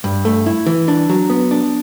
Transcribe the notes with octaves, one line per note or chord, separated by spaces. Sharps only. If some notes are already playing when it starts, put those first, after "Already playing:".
G2
A3
E4
E3
D4
F#3
B3
D4